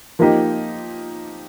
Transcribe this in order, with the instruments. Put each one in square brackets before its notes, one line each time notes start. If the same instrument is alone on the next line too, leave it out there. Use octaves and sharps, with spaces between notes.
[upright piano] F3 A#3 D#4 G4